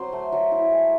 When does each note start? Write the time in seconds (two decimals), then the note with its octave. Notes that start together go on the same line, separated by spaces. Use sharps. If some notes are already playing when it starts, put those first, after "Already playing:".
Already playing: F#3 C4 C5
0.13 A3
0.32 F#3
0.52 E4
0.72 G#3